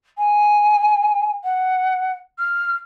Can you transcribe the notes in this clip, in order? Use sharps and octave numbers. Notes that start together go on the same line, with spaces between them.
G#5
F#5
F6